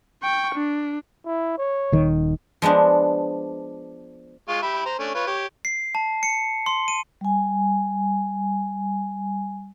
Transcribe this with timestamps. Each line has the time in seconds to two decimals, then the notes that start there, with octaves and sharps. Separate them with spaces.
0.23 G5 C#6
0.55 D4
1.25 E4
1.58 C#5
1.92 D#1 D#3
2.62 F3 G#3 B3 D4
4.48 G#3 F4 C#6
4.62 G4 E5 B5
4.86 C5 A#5
4.99 A3 C#4 D4
5.14 F4 B4 C#5
5.27 G4 C#5
5.65 C7
5.95 A5
6.23 C#7
6.66 C6
6.88 D#7
7.21 G3 G#5